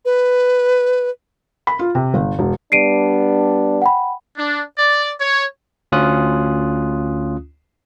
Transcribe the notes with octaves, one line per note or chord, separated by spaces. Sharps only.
B4
B5
F4
C3
G1
E1
G3 B3 D4 C7 D7 D#7
F#5 G5 B5
D4
D5
C#5
D2 C#4 F4 D#6 F#6